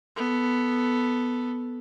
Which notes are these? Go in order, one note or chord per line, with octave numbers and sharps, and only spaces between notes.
B3 A4